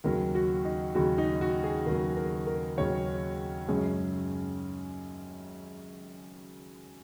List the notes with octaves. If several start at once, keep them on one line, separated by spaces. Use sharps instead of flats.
D#2 C#3 F#3 A#4
F#4
D#4
D#2 C#3 F#3 F#4
D#4
F#4
G#4
D#2 C#3 F#3 A#4
A#4
A#4
D#2 C#3 F#3 C#5
F#2 C#3 G#3 C#4